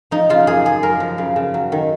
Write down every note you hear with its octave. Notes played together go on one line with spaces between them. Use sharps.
F3 D#4
C#3 F4
F#2 G#4
F#2 G#4
F#2 A#4
F3
C#3
C#3
F#3
D#3